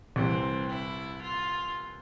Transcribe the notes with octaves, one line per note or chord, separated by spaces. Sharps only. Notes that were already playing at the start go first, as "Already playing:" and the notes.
C2 C3 E3 C4
E4
F4